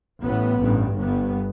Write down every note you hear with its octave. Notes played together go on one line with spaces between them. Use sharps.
A1 A2 B3
A1 G2
G1 G2 B3